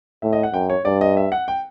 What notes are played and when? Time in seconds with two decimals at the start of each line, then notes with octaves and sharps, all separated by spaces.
0.22 A2 E5
0.33 D#5
0.43 F#5
0.53 F#2 G5
0.70 C#5
0.85 G2 D5
1.01 D#5
1.17 E5
1.32 F#5
1.48 G5